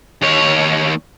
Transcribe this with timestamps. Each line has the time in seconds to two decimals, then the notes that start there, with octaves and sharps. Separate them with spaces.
0.22 D#2 C#5